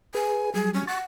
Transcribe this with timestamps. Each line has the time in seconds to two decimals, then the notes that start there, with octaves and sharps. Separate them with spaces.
0.14 G#4 B4 G#5
0.54 F#3 G3 G#4
0.74 C#4
0.87 F#5 C#6 A6